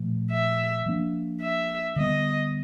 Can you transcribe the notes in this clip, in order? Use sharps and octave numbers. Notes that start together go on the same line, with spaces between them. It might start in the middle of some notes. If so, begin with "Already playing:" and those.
Already playing: A#2 F3 A3
E5
F3 A#3 D4
E5
D3 G3 B3 D#5